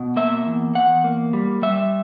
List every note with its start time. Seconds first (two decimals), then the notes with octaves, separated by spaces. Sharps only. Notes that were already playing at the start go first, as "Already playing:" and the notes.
Already playing: B2
0.16 A#3 E5
0.46 E2
0.75 E2 F#5
1.04 A#3
1.33 G3
1.62 G3 E5